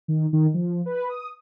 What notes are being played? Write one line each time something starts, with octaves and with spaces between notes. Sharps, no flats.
D#3
D#3
F3
B4
D#6